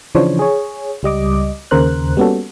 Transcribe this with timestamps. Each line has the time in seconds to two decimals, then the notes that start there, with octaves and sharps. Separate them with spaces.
0.15 C#3 E3 F3 D4 C5 C#5
0.39 G#4 C#5
1.03 C#2 G3 D#5 D6
1.71 D#2 C#3 A#4 C5 F#6
2.17 G3 A#3 B3 C#4 F#4 A4